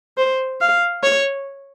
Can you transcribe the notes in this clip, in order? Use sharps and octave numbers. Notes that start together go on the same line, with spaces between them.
C5
F5
C#5